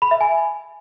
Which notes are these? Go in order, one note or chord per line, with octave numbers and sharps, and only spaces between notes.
B5
E5
G#5